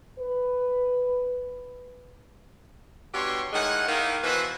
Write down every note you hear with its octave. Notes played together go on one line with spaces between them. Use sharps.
B4
G2 B2 G4 C#5 C6
A2 D#3 G#3 F#5
D#3 A#3 E4
B2 E3 B4 C5 E5 F#5